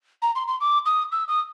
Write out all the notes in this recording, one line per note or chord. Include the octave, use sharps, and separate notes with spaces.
A#5
C6
C6
D6
D#6
E6
D#6